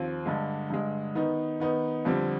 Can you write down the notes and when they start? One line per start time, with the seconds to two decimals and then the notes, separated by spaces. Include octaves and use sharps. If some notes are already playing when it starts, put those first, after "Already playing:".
Already playing: D#2 F3 C4
0.25 G2 D3 G#3
0.70 G2 D3 G#3
1.15 D#3 B3 D#4
1.60 D#3 B3 D#4
2.05 F2 D3 G3 C4